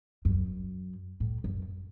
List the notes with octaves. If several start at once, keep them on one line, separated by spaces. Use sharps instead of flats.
F#2
A2
F#2